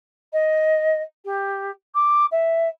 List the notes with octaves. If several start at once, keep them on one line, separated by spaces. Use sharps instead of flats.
D#5
G4
D6
E5